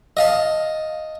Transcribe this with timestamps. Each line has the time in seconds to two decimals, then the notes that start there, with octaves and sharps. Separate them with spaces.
0.17 D#5 F5 A5